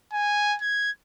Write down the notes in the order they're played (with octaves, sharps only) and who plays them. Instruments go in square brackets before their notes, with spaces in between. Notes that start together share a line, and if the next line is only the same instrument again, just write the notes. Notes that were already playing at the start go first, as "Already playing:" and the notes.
[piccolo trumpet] G#5
G#6